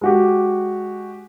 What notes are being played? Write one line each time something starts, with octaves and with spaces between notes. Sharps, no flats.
G#3 F#4 G4